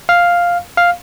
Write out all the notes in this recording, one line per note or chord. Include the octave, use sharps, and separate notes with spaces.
F5
F5